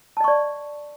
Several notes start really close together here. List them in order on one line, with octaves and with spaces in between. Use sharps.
A5 D#5 C#6 D5